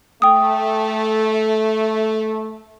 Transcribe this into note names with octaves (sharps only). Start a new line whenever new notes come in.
A3 G5 D#6